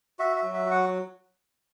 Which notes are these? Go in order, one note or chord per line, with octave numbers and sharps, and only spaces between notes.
F#4 E5
E5
F#3
E5
F#4
F#5